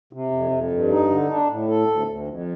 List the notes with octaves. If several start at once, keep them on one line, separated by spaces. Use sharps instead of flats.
C3
F2
F2
G2
D#4
D3
D4
A2
A4
D2
D2
F2